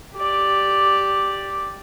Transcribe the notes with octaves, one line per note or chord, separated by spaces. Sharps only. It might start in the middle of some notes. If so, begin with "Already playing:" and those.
G4 D5